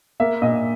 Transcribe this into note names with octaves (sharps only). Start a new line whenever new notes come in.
A#3 E5
A#2 D#5